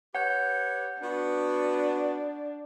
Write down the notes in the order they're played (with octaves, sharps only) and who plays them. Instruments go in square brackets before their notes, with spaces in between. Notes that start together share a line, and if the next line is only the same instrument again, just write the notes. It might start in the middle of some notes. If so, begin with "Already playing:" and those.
[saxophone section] G4 B4 C#5 [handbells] F#5 G6
[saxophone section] B3 F#4 [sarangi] D4